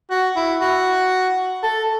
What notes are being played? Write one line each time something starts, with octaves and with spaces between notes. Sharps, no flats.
F#4
E4
F#4
A4